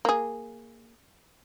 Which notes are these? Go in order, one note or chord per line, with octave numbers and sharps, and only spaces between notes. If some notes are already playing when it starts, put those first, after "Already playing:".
A#3 G#4